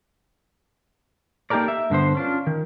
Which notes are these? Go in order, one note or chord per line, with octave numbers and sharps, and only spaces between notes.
A#3 D#4 G4 A4 A#4 D5
E5
G2 D3 B3 C5
C#4 D4 F4
D#3